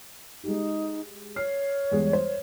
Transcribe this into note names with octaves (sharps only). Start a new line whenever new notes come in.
G#3 D#4 G4
C#5 F6 C7
E2 G3 G#3
C5